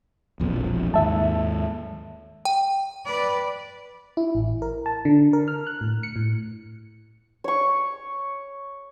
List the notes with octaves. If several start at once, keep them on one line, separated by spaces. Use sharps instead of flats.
E1 A#1 F2
D#2 G#2 E5 A5
G5
B4 D5
E4
A1
A#4
A5
D3
A#4
F6
F#6
A2
C#7
A2
C#5 C#6